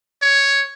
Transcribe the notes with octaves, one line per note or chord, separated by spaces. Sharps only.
C#5